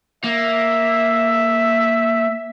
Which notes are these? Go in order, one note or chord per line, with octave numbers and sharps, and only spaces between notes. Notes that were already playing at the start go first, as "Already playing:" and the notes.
A#3 E5